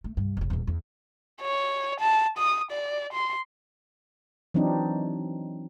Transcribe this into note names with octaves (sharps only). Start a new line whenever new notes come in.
A3
C2 G2
F1 C#3
D#1 E2
E2
C#5
A5
D#6
D5
C6
E3 F#3 C4 D4 D#4